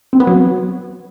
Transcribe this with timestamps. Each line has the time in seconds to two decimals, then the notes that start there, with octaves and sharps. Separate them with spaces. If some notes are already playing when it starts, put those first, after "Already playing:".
0.13 C4
0.20 B3
0.27 F#3